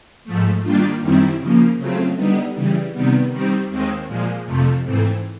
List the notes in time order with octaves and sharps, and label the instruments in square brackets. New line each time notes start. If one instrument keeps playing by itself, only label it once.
[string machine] G#2 F3 A3
D#3 G3 A#3 D4 F4
F#2 D#3 G3 C4 E4
C#3 F3 A#3
C#3 F#3 A3 C4 F4
D3 G3 B3 D#4
C#3 E3 G3
C3 D#3 G3 B3
D#3 G3 C4
D#2 D#3 G#3 C4
A#2 F3 G#3
F2 C3 F3 A3
G#2 E3 A3 C4